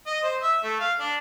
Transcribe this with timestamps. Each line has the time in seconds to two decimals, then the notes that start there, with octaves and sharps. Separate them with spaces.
0.06 D#5
0.23 C5
0.42 E5
0.63 A3
0.80 F5
1.00 D4